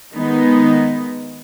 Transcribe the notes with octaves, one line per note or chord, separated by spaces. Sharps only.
D#3 G#3 B3 D#4